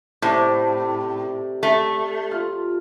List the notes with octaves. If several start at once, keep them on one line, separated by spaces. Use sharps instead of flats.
A2 C3 D5
A3
F4